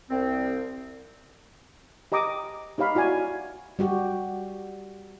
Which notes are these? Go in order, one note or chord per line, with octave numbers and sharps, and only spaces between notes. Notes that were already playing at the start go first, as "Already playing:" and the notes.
C2 C4
G4 D#5 A#5 D6 D#6
D#4 G4 C#5 F5 B5
E4 F#4 D5 G#5
G3 F#4 G4